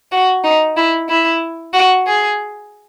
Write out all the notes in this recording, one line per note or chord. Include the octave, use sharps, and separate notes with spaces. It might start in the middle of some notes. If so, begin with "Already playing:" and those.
F#4
D#4
E4
E4
F#4
G#4